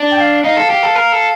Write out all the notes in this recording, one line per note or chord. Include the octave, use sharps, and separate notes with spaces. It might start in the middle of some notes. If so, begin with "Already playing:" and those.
Already playing: D4
G5
F5
D#4 F5
A4
G4
A4
A#4
A4